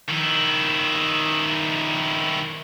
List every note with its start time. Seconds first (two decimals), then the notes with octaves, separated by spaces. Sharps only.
0.09 D#3 E4